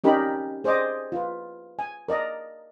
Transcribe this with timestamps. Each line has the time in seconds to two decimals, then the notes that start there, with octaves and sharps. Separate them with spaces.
0.04 C#4 D#4 G4 A#4 D5 B5
0.64 G#4 C5 D5 D#5 D6
1.12 F4 B4
1.79 G#5
2.08 A#4 D5 D#5 A#5